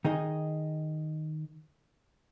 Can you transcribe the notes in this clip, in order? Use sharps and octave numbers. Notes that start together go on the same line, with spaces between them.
D#3 D#4 G#4 D#5